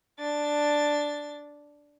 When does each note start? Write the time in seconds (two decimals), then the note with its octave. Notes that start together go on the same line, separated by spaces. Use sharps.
0.18 D4 A6